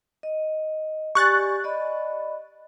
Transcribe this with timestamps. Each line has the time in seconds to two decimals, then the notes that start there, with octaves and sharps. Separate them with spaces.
0.23 D#5
1.15 G4 D5 G#5 C#6 F#6 A6
1.64 D5 D#5 B5